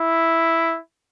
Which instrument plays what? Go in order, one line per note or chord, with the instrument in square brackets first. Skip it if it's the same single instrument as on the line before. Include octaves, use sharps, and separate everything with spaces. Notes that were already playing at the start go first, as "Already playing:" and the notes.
Already playing: [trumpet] E4